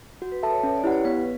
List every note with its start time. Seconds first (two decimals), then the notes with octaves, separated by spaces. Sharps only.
0.22 F#4
0.32 B4
0.43 A4 B4 E5 A5
0.52 C#5
0.63 C#4
0.78 D5
0.84 E4 G4 B4 F#5
0.92 C#5
1.05 B3 B4